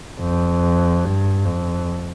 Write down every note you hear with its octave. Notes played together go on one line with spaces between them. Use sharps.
F2
G2
F2